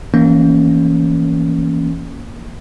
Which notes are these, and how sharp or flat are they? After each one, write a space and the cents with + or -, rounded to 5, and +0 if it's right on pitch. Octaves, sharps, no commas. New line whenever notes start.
E3 +0 A#3 +0 C#4 +0